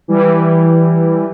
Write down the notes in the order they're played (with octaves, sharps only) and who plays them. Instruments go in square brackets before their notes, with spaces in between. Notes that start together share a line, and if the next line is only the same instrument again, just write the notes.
[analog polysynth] E3 G3